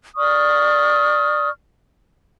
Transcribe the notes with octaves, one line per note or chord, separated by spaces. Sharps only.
D5 C#6 D#6 F6